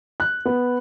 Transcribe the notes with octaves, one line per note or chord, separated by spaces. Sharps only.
F#6
B3